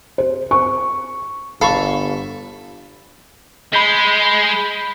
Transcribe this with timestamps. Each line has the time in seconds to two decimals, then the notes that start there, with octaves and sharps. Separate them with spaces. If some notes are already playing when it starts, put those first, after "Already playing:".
0.18 C5
0.51 C#6
1.61 G1 A4 F5 B5 C#6
3.73 G#3 B5 G6 B6